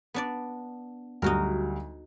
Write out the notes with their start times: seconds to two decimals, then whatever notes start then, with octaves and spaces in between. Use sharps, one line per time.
0.14 B3 D4 D5
1.22 D2 F#3 G3 D#4 F#4 A#4